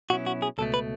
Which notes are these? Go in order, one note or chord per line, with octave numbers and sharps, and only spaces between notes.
B2 F#3 C#4 E4 F#4
F#4
G#4
C#2 B2 A3 A4
B4